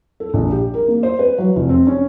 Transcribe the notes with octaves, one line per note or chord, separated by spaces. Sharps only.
A4
A#1
G4
A#4
A#3
C5
B4
F#3
F1
C4
C#4